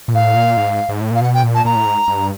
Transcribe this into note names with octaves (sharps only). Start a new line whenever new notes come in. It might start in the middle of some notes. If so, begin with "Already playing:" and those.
A#2
A2 F5
A#2
G#2
G#2
A2
A#2 F5
B2 F#5
G5
A#2
A5
A#2 A#5
A2
G#2
G2